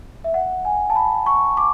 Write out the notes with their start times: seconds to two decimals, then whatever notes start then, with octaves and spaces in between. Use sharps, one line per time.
0.24 E5
0.34 F#5
0.65 G#5
0.90 A5
0.96 B5
1.26 C#6
1.57 D6